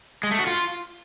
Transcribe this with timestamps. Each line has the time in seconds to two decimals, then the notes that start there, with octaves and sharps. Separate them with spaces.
0.23 G#3
0.31 A3
0.39 F#4
0.47 F4